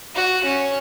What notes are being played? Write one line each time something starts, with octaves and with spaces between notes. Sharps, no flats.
F#4
C#4